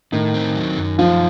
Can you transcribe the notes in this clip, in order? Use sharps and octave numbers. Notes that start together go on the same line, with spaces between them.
A2 D#3 D#4
C4
F#3
F#2
F3 D#4 F4